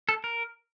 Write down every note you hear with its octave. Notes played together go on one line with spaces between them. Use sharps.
A4
A#4